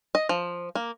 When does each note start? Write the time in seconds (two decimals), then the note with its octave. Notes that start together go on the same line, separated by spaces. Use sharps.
0.15 D#5
0.29 F3
0.75 A#3